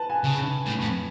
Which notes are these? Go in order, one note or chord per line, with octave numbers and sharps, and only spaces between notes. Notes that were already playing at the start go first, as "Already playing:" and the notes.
Already playing: B4 A5
G#5
C#3
A2
F2